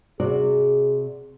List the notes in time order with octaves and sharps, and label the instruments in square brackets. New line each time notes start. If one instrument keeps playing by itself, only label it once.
[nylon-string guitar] C3 F#4 D5 [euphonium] G#4